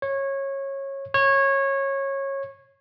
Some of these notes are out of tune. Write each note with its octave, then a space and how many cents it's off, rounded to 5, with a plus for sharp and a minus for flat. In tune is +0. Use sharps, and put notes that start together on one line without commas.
C#5 -20
C#5 -20